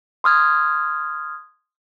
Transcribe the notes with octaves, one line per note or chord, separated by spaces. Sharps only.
C6 D#6 F6 G#6